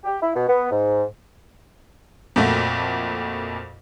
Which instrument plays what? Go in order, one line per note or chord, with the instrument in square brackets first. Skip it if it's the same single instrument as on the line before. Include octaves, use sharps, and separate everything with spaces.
[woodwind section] G4
E4
B2
B3
G#2
[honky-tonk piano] F2 A#2 A3 F#4